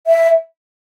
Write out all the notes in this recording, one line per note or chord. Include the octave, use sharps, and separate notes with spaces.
E5